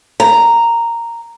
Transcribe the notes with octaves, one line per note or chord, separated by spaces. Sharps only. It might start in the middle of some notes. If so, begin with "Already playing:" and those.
A#5